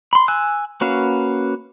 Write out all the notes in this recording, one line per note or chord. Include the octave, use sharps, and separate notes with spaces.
B5 C6
G#5 E6 F#6
A#3 C#4 F#4 B4 F5